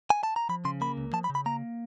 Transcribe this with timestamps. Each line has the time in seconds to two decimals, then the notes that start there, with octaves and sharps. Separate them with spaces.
0.10 G#5
0.23 A5
0.36 A#5
0.49 F3 B5
0.65 C#3 C6
0.81 A#3 B5
0.97 C#2
1.13 F3 A5
1.24 B5
1.30 C#3
1.35 B5
1.46 A#3 A#5